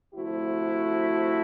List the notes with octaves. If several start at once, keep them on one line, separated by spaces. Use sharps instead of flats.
D2 C3 F3 A3 E4 F#4